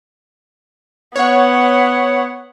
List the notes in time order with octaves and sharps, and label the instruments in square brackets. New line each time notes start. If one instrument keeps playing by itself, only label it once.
[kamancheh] B3 F#5 [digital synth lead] C#5